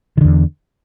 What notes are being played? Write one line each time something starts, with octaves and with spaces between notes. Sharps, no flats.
E2 D3 D#3